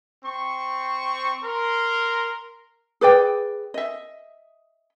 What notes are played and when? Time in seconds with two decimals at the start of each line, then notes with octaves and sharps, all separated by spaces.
0.24 C4 C#6
1.43 A#4 C6
3.01 G#4 B4 D5 G5
3.74 D#5 E5